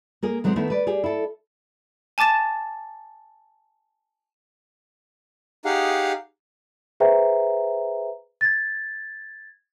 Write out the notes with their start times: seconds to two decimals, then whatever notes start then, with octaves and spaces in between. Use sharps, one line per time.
0.23 A#3 G#4 A#4
0.44 E3 F#3 G#3 A3 C4
0.56 D#3 A3 B3 D#4 E4
0.70 B4 D5
0.87 G4 G#4
1.04 E4 A4
2.18 G#5 A5 D6 A6 E7
5.65 D#4 G4 G#4 F5 F#5
7.00 G#4 B4 C5 E5 G5 A#5
8.41 G#6 A6